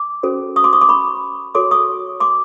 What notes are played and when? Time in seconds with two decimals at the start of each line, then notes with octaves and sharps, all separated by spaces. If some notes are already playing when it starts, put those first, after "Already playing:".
Already playing: D6
0.23 C#4 F#4 A4 C5
0.56 C#6 D#6
0.64 C6 D6
0.73 C#6 D#6
0.81 C6 D6
0.89 B5 C#6
1.55 F#4 A4 C#5 C6 D6
1.71 C#6 D#6
2.20 C6 D6